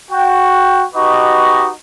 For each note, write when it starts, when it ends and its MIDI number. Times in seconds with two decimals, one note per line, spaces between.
0.11 0.85 66
0.11 0.85 79
0.95 1.69 63
0.95 1.69 66
0.95 1.69 67
0.95 1.69 71
0.95 1.69 75
0.95 1.69 85